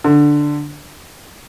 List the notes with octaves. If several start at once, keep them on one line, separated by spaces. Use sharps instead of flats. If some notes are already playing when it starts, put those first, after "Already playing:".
D3